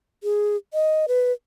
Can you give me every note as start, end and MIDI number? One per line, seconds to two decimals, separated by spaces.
0.24 0.56 68
0.74 1.06 75
1.08 1.32 71